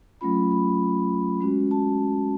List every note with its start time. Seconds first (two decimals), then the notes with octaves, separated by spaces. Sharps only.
0.21 F#3 A3 C#4 F4 B5
0.51 B5
1.40 G#3 C#4 F#4
1.71 A5